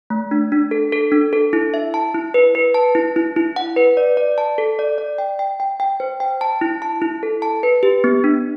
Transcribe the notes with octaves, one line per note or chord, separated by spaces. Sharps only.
A3
D4
D4
A4
A4
D4
A4
E4
E5
A5
E4
B4
B4
A5
E4
E4
E4
F#5
B4
D5
D5
A5
A4
D5
D5
G5
G5
G5
G5
C5
G5
A5
E4
A5
E4
A4
A5
B4
G4
B3
D4